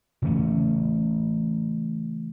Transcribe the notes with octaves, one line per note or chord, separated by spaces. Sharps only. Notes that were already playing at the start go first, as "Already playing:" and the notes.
C#3 E3 A3 C#4